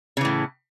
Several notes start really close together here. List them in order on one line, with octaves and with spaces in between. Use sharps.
C#3 E3 A2